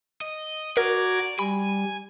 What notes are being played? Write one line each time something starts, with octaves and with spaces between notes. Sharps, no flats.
D#5
F#4 A#4 D5 A#5 G#6
G3 G#5 B5